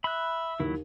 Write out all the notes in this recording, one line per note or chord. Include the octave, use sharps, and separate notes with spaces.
E5 B5 F#6
D#2 F#3 E4